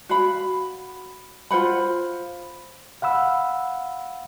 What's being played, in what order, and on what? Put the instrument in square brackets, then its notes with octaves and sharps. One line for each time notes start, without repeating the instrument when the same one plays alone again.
[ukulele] F#4 F5 B5
F4 C5 F#5 B5
[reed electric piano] F5 F#5 B5 E6